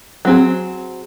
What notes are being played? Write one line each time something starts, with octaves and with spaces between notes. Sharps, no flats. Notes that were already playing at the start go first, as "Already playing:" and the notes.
F#3 C4 G#4